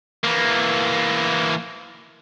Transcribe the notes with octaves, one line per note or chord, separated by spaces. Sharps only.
E3 A#3